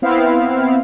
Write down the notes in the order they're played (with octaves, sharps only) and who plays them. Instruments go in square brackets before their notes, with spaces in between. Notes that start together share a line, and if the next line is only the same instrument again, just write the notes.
[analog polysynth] B3 C4 E4 F5